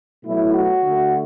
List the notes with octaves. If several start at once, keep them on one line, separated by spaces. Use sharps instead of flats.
B2 F#3 A3 E4
F#4
D3 A3